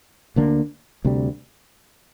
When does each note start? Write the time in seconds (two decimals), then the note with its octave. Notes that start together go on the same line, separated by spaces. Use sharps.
0.36 D2 D3 A#3 D4
1.05 D2 C3 G3